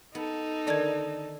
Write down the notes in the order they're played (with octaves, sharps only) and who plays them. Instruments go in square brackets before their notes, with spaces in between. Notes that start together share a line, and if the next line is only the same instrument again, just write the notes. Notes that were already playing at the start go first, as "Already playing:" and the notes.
[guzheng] B3 [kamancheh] D#4 A4
[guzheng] D3 D#3 A5 [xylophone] D5 G#6